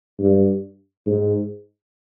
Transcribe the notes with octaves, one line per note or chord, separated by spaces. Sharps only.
G2
G#2